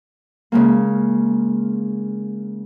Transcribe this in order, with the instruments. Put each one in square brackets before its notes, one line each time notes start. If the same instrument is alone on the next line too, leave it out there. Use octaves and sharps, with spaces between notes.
[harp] C#3 G#3 A#3